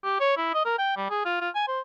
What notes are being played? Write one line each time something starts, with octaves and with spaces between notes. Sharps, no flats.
G4
C#5
E4
D#5
A#4
G5
G3
G#4
F4
F4
G#5
C5